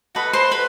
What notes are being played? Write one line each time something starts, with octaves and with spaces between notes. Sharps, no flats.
F#4 A4 B4 D#5 B5
C5 C6
B4 B5